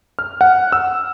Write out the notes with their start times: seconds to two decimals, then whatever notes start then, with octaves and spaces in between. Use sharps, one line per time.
0.19 F6
0.41 F#5
0.72 E6